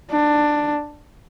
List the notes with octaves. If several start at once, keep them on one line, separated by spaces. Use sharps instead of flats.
D4